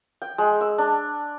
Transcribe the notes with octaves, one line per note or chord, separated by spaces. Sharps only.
G5
G#3
E6
D4